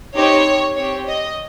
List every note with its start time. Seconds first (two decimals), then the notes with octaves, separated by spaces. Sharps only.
0.15 C4 D#4 G4 C#5
0.76 C4 G4 C#5
1.07 D#5